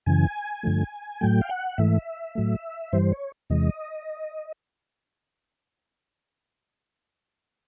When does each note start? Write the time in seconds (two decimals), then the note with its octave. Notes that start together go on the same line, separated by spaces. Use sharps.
0.06 F#2 C#3 E3 G#5
0.63 G2 D3 F3 A3
1.21 A2 F#3 A3 G5
1.41 F5
1.49 F#5
1.78 G#2 E3 A3 E5
2.35 A2 F#3 A3
2.93 G2 E3 G3 C5
3.12 C#5
3.50 E2 C3 E3 G#3 D#5